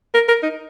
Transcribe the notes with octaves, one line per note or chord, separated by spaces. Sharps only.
A#4
A#4
D#4